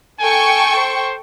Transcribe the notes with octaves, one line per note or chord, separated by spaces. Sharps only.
A4 G5 G#5 C#6
C5